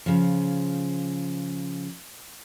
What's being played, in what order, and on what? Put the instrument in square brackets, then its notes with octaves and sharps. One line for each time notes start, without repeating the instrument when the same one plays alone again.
[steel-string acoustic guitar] C#3 F3